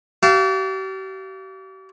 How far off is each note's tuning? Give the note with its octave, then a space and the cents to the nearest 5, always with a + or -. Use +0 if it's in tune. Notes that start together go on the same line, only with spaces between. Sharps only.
G4 -45 F5 -20 A5 +0